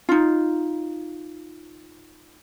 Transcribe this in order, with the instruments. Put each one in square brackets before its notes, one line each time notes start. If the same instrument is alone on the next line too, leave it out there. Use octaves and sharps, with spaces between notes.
[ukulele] D#4 F4